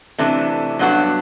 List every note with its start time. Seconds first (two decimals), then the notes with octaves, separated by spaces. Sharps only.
0.18 C3 E3 A3 D4
0.79 G2 F#3 B3 D4 F#4